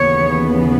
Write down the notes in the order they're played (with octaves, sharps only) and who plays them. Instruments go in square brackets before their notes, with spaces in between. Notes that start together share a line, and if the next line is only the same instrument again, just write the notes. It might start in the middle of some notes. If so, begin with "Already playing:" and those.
Already playing: [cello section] D#2 C#3 E3 B3 C#5